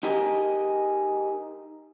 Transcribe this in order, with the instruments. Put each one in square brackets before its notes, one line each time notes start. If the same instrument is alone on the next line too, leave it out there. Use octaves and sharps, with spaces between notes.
[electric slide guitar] D#4 G4 G#4 A#4 D#5